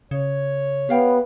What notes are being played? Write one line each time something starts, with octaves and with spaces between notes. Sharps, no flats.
C#3 C#5
B3 G4 F5 G5